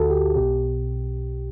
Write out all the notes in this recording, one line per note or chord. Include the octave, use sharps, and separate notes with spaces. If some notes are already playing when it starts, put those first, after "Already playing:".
Already playing: D2 D3 F#4 G4 A4
G4
B1 B2 G4